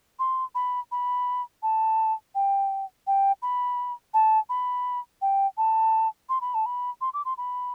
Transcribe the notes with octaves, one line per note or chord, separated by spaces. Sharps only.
C6
B5
B5
A5
G5
G5
B5
A5
B5
G5
A5
C6
B5
A5
B5
C6
D6
C6
B5